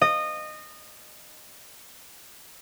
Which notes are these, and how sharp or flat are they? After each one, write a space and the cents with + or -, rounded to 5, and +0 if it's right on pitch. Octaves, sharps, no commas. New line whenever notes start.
D#5 -20